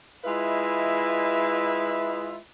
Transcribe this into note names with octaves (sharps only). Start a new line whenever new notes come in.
G#3 E4 F4 B4 D#5 E5